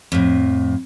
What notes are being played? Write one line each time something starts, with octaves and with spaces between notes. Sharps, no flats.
F2 A2